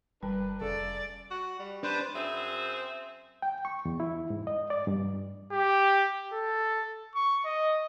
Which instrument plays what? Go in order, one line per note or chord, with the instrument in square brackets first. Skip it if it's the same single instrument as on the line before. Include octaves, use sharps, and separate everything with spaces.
[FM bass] G1 [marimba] G3 [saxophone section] D4 A#4 B4
[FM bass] F1 [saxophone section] C#3 A3 A4 [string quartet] D5
[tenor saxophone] F#4
G3
[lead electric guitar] D4 [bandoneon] B4 C5
[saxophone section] F#2 C4 G#4 C5 E5
[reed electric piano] G5
C#6
E2
E4
G#2
D#5
D5
G2
[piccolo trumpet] G4
A4
C#6
D#5